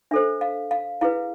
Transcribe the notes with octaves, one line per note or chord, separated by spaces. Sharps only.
D4 A4 C5 E5
F5
F5
E4 G#4 B4 F5